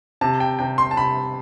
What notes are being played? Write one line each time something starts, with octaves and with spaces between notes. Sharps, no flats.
C3 A5
G5
C3 G5
C6
A5
C3 B5